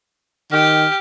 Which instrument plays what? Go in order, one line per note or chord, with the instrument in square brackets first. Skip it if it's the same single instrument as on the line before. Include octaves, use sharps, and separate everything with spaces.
[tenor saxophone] D#3 [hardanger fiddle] G4 [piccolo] F6